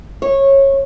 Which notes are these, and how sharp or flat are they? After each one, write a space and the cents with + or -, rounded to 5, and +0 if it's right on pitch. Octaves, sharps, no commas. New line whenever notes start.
C#5 -20